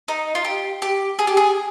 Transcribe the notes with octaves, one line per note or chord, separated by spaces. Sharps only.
D#4
F4
G4
G4
G#4
G4
G#4